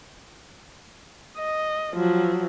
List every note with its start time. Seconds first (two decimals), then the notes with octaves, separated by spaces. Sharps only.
1.38 D#5
1.94 F3 F#3